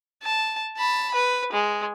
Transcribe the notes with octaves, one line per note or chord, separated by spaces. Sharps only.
A5
A5 B5
B4
G#3